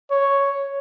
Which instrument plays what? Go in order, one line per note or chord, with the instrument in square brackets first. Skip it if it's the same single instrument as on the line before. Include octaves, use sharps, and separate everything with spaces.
[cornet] C#5